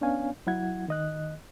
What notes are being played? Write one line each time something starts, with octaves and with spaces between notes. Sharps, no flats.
B3 C#4 D4 C#5 F5 G#5
F#3 E4 F#5 G#6
D#3 D#5 F#6